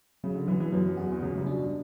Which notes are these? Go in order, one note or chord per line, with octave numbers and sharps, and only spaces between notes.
C#3 F#3
D3
E3 F#3
E3
F#2 B3
E2 F#4
E2
F#2 C#3
G2
B2 D4